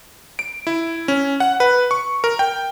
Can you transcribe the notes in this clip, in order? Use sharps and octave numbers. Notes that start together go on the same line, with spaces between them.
D7
E4
C#4
F#5
B4
C#6
A#4
G5